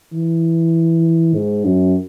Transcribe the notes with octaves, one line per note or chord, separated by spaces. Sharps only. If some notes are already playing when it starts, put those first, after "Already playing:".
E3
G#2
F#2